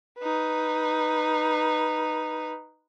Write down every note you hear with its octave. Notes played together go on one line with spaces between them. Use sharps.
D#4 B4